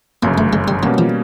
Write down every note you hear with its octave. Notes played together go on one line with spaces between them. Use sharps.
G1 F#2 C#3 A#3
A3
G#3
G3
B2 F#3 G3 A#3 C#4
F3